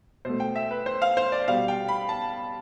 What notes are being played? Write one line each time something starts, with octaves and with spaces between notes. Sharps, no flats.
B2 A3 C5
G5
E5
B4
C5
F5
C5
D5
B2 G3 F5
G5
B5
A5